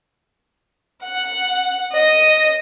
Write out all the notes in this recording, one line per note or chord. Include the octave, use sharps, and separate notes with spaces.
F#5
D#5